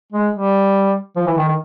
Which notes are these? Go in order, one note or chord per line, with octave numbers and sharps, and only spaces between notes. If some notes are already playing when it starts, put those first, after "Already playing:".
G#3
G3
F3
E3
D#3
D#3